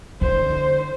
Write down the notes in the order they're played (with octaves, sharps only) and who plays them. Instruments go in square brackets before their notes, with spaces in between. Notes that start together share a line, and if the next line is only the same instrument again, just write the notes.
[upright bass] D3 [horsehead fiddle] C5